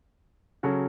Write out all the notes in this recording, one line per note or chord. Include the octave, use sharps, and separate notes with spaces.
C#3 F#3 C#4 F#4 A4